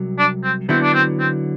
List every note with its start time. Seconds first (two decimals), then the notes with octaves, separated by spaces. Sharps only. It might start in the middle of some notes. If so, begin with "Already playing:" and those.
Already playing: C2 C3 F#3
0.19 D4
0.43 C4
0.69 D3 F#3 B3 C4 E4
0.83 D4
0.94 C4
1.19 C4